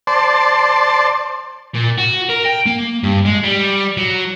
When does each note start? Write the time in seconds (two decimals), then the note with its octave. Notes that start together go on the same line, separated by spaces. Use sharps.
0.07 C5 D5 A5 C6
1.75 A#2
1.99 F#4
2.30 A#4
2.46 G5
2.66 A#3
3.03 G2
3.25 G#3
3.44 G3
3.97 F#3